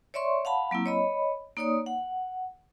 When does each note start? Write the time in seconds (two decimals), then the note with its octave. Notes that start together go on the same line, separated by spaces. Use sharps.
0.14 C#5 D5 E5 C6 C#6
0.45 F5 F#5 A5 B5
0.71 F#3 A#3 C4 E4
0.86 C#5 D#5 B5
1.57 A#3 D#4 C#5 D5 D#6
1.86 F#5